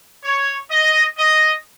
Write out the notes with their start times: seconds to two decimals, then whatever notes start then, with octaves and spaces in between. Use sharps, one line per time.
0.23 C#5
0.70 D#5
1.18 D#5